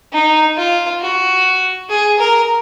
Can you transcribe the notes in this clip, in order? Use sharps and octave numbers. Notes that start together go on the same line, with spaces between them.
D#4
F4
F#4
G#4
A#4